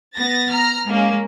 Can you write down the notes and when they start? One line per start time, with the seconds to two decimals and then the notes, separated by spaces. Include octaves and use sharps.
0.16 B3 A6 A#6
0.52 A#5 F6
0.88 G#3 A#3 C#4